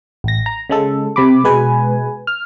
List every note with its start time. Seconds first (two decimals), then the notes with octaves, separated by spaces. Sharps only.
0.24 A1 A#6
0.46 A#5
0.70 C#3 G#3 A4
1.16 C3 B5 D6
1.44 B2 G#3 B4 G#5
2.27 F6